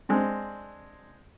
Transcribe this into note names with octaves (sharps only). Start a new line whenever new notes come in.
G#3 C4 D4